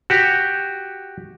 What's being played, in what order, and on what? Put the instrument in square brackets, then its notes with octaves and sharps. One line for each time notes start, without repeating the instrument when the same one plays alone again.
[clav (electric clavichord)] F#4 G4